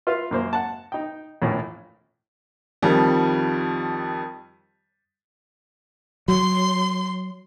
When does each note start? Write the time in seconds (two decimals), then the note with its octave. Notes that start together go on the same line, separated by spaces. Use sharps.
0.07 F4 B4 E5 F5
0.31 F#2 A#3 C5
0.53 F#5 A5
0.92 D#4 G5
1.42 A#1 E2 A2 C#4 F5
2.82 F2 D#3 F3 G3
6.28 F#3 C6